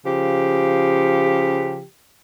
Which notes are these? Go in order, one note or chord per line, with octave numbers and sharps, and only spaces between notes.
C#3 F3 G4